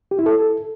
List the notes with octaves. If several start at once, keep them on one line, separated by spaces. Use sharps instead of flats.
G4
E4
A4